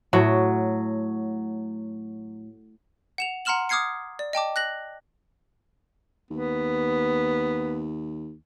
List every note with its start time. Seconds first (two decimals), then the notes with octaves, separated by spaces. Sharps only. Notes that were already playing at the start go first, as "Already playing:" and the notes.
0.13 A2 F#3
3.18 F#5 E7 F7
3.45 F#5 A#5 C6 F6 E7 F#7
3.69 D6 D#6 F6 G#6 C7 C#7
4.19 D5
4.33 D#5 G5 A5 D6
4.56 F#6 A#6 F#7
6.31 D#2 B3